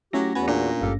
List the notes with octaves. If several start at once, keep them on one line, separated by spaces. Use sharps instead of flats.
F#3 A3 C#4 E4 G4 A#6
E2 B3 F#4 G#5
A#2 D4
G#1 G2 G4 A4 F5